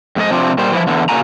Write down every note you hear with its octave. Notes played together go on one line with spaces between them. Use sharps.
F2 G#2 D4 D#5
C3 F3 C4 D4
A#2 G3 C5
E3 F3 E4
E2 D3
A#2 C#3 A#3 F#4 G#5 A#5